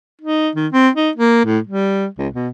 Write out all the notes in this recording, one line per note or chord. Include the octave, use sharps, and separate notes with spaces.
D#4
D#3
C4
D#4
A#3
A2
G3
C#2
B2